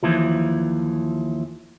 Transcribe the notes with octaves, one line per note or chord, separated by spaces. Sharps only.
D#2 E3 F3